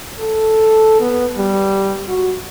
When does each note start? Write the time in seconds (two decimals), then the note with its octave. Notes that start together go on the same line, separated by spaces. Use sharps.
0.19 A4
1.01 B3
1.37 G3
2.09 F#4